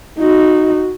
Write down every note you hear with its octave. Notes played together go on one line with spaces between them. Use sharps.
D#4 F#4